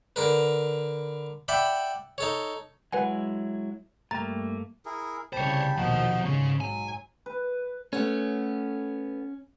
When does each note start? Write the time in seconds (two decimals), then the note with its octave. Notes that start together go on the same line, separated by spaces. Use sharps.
0.16 D3 A#4 B4
1.48 D5 E5 F#5 G5 B5
2.18 D#4 A4 C#5
2.92 F#3 G#3 E4 B4 F#5 G#5
4.11 G2 A3 A#3 A#5 A6
4.86 E4 G#4 A#4
5.33 C2 C#3 C5 C#5 G5 A5 B5
5.77 A#1 D#2 B2 F3 D#4 F#4
6.25 G#2 C#3 C#5
6.60 F#3 G#5
7.26 B4
7.93 A3 B3 C#4